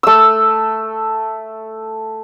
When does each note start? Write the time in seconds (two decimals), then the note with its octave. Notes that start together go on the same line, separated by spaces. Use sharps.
0.03 A3 E6